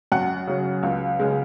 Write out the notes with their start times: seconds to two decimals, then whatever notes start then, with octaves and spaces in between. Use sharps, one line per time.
0.12 F#2 F#5
0.47 C#3 F#3
0.83 C#2
1.19 C#3 G#3